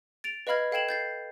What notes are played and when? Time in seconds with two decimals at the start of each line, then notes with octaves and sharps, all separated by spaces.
0.24 A6 D7 F7
0.47 B4 D#5 F5 B5 F6 G#6
0.72 A4 F5 G5 G#6 E7 F#7
0.89 G6 A6 C7